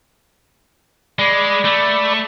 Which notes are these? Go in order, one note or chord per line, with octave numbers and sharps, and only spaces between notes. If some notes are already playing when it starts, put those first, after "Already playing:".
G#3 D5 B5
A3